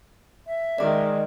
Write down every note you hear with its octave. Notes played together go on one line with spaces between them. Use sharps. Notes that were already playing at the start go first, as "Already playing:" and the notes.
E5
D#3 G#3 D5 D6